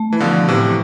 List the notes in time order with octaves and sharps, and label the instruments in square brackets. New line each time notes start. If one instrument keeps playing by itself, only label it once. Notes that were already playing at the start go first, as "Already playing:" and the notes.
Already playing: [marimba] A3
[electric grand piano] E3
[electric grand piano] B2 D3 [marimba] F3
[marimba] A2 [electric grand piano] C3 E3